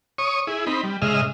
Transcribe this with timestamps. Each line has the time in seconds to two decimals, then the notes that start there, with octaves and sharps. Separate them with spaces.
0.18 C#5 C#6 D#6
0.47 E4 G#4
0.67 C4 D#4 B5
0.83 G3
1.02 G#2 C#3 G#3 D#5 E5 F6